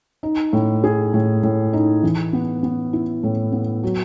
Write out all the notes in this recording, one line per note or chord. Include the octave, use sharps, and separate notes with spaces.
D#4
A2
G#4
A2
A2
D#4
E3
B3
B3
E4
A2
B3
F#3